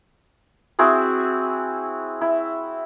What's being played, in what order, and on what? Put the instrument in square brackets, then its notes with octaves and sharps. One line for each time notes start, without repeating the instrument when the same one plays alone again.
[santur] C4 E4 F#4 G#4
E4